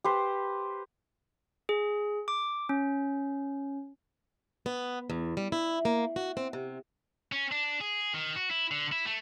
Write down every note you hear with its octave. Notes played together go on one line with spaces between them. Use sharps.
G4 B4 C5
G#4
D6
C#4
B3
E2
G3
E4
A#3
F#4
C4
C3
C#4
D4
G#4
D#3
F#4
E4
D3
E4
A3